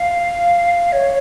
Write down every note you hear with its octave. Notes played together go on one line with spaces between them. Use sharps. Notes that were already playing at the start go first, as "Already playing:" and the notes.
Already playing: F5
C#5